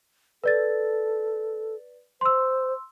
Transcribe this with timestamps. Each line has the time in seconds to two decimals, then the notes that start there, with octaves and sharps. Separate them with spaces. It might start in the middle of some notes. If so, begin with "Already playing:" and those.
0.44 A4 B4 D5 A6
2.21 C5 C6 E6